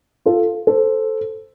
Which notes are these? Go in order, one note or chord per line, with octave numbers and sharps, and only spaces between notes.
F4 A4
A4 C5